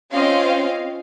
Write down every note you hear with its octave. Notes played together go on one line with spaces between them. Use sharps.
C4 C#4 F4 D#5 F5